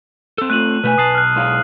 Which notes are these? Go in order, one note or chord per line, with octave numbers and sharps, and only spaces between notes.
C4 A4
A3 F4 F#6 D#7 F#7
B2 A3 B4 G#5
B1 A5 D#6 C7 F#7
F6 F#6
G#3 E4 F5